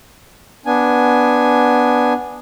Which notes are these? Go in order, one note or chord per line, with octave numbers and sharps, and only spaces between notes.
B3 D4 G#5